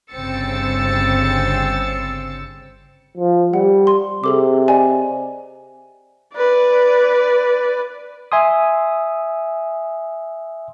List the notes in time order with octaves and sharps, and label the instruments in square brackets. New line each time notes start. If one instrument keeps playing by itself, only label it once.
[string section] G1 C#3 C4 E6 A6 C#7
[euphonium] F3
[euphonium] G3 [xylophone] F#5
[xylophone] C6
[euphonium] C3 [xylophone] G#4 A4 D6
[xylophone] D5 D#5 G#5
[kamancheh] B4 D5
[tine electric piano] E5 G#5 C6 D#6